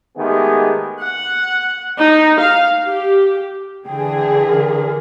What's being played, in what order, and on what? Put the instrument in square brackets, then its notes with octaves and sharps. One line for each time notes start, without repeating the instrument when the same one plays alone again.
[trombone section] D#3 G#3 A3 B3 G4 G#4
[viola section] F#5
D#4
F5
G4
[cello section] D3 E3 G#4 [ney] G5
[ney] A#4